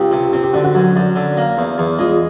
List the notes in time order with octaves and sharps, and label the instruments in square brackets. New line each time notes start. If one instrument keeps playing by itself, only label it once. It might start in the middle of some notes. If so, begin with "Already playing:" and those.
Already playing: [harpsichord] C#2 [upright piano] G4
[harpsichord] C3
[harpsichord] C4 [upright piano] G4
[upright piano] G4
[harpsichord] D3 [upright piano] F#4
[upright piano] F#4
[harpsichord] F#2
F#2
D3
A#3
E2
E2
[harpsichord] G#3 [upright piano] F4